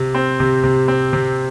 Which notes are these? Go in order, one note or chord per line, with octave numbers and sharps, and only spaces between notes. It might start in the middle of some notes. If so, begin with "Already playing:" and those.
Already playing: C3
C4
C3
C3
C4
C3